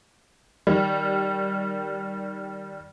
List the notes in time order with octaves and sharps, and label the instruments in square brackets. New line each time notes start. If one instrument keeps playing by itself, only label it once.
[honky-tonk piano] D#3 G3